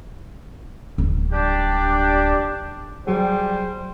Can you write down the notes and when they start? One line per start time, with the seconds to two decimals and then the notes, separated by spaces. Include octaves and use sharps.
0.98 D1
1.33 G3 D4 G4
3.07 F#3 G3 G#4 C5